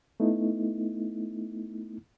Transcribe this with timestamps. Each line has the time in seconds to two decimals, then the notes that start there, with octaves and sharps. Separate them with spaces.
0.20 A3 B3 D#4 E4